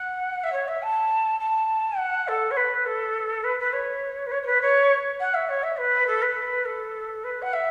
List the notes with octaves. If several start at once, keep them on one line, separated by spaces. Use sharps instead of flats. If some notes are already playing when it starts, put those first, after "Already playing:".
Already playing: F#5
E5
C#5
E5
A5
A5
F#5
A4
C#5
B4
A4
B4
B4
C#5
B4
C#5
C#5
B4
C#5
F#5
E5
C#5
E5
B4
A4
B4
A4
B4
F#5
E5